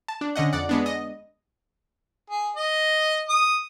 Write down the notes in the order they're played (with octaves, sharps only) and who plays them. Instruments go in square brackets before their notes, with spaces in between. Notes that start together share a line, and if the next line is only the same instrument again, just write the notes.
[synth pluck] A5
D4
D3 C#4 D#5 F#5
F2 D5 F#5
G#3 B3 D4
D#5
[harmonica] G#4
D#5
D#6